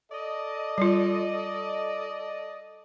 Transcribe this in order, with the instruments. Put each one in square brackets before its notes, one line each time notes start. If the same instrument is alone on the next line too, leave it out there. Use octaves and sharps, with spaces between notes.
[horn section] A4 D5 D#5
[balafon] G3 F4